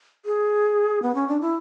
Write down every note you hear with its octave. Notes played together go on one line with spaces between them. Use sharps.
G#4
B3
C#4
D4
E4